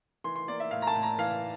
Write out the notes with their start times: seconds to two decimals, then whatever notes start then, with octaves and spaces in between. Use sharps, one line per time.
0.24 E3 C6
0.36 C6
0.48 A#3 D5
0.60 E5
0.71 A2 F5
0.82 A#5
0.87 A5
0.95 A2
1.03 A#5
1.18 E3 F5